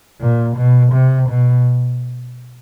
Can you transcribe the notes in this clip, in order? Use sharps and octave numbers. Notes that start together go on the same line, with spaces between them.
A#2
B2
C3
B2